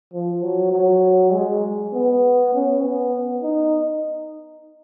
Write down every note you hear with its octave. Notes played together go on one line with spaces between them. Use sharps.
F3
F#3
F#3
G#3
B3
C#4
B3
D#4